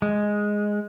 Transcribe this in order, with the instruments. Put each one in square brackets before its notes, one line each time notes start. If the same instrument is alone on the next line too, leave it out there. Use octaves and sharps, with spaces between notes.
[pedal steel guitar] G#3